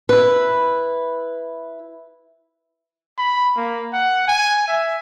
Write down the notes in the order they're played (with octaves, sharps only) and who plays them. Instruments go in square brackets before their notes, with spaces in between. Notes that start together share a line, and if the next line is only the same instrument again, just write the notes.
[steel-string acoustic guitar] E4 B4
[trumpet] B5
A#3
F#5
G#5
E5